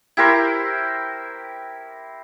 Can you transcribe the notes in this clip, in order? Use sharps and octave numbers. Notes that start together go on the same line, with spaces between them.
E4 G4 A#4 C5